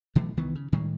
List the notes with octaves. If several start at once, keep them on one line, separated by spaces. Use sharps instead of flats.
B2 E3 F#3 A3
C2 D#3 E3 B3
C#3
A2 D#3 G3 G#3